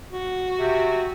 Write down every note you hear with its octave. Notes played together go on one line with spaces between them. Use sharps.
F#4
C3